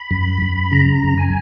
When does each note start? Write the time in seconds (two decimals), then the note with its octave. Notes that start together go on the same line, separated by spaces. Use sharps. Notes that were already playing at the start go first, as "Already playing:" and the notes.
Already playing: B5
0.11 F#2
0.42 F#2
0.72 C#3 A#5
1.03 F#2
1.18 G#5